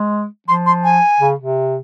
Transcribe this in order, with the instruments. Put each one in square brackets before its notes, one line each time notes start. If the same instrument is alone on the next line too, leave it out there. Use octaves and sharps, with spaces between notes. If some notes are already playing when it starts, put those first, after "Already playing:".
Already playing: [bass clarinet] G#3
[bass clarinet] F3 [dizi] C6
[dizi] C6
G#5
[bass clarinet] C#3
C3